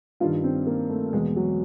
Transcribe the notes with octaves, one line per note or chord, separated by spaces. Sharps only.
G2 D#3 F4
C4
A#3
A3
E2 B2 G#3
F#3